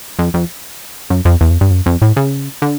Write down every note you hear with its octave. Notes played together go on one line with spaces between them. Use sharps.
F2
F2
F#2
F2
E2
F2
G2
F#2
F2
A2
C#3
D3